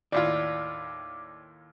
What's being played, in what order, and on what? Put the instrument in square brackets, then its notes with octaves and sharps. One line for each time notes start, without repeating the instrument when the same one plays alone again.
[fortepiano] D#2 A2 F4 [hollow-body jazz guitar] D5 [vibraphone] D6